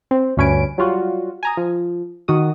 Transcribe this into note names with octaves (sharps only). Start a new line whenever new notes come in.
C4
D2 G2 C#4 B4 G#5 D7
F#3 G3 F4 F#4
G#5 A#5 D#6
F3
D#3 F#4 D#6